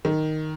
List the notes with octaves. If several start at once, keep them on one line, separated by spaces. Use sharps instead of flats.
D#3